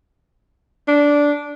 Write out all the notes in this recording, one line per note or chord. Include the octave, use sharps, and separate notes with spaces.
D4